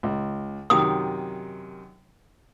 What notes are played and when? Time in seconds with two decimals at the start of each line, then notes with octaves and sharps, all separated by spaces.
0.03 C#2
0.70 F#2 C3 D#3 D#6